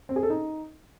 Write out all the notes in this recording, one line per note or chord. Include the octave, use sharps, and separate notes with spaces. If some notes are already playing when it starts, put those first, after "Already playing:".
C4
G#4
A4
D#4